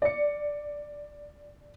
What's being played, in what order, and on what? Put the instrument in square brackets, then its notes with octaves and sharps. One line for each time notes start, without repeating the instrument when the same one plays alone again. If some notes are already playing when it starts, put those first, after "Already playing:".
[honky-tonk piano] D5 C#7